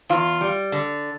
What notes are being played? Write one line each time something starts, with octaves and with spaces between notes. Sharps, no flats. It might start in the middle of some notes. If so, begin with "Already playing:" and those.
E2 F4
G3
D3